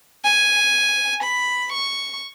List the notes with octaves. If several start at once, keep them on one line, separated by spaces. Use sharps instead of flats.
G#5
B5
C#6